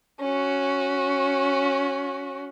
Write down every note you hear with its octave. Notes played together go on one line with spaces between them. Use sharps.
C#4 F#4